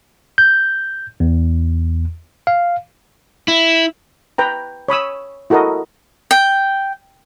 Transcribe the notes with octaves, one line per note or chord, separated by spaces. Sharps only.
G6
E2
F5
E4
B4 G5 A#5
C#5 B5 D#6 E6
E4 F#4 A4 A#4 D#5
G5